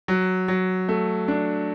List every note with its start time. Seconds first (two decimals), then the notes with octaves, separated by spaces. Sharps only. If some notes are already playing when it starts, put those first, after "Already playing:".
0.08 F#3
0.48 F#3
0.89 A3
1.28 D4